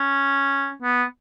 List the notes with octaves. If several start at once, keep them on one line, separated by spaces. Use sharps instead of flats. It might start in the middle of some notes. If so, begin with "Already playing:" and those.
Already playing: C#4
B3